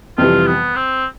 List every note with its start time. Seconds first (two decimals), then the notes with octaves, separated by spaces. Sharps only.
0.18 F2 C3 E3 G3 F4
0.47 B3
0.75 C4